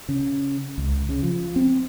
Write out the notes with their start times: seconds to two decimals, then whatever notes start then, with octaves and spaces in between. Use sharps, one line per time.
0.09 C#3
0.78 C#2
1.09 C#3
1.23 F3
1.56 C4